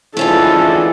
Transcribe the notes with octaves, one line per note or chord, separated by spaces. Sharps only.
G#2 D3 E3 A3 C#4 F4 A4